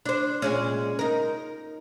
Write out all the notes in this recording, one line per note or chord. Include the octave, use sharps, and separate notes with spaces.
D4 C5
A#2 G#3 C#4
D#4 A#4